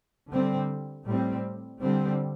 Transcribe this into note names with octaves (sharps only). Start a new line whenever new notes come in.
D3 G3 C4
A2 G3 C4
D3 G3 C4